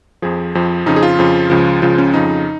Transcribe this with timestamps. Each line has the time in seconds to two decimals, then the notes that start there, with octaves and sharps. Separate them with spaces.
0.22 F2 F3 G#4
0.55 F2 F3
0.86 F2 C#3 F3 D#4
0.96 G#4
1.03 F4
1.19 F2 C#3 F3
1.50 C#2 C#3 F3
1.82 C#2 C#3 F3 F4
1.98 C#4
2.13 F2 C#3 F3 D#4